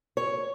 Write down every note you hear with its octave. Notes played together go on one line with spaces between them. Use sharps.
C#5